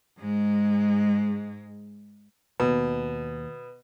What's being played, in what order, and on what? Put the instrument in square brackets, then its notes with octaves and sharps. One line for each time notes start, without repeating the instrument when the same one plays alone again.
[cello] G#2 G#3
[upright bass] D#2 [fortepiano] B2 [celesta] B4